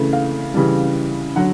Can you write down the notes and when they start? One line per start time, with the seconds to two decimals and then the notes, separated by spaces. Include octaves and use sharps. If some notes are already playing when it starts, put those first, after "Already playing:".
Already playing: C#3 E3 A3
0.13 F5
0.54 C#3 E3 G3
1.36 D3 F#3 F#5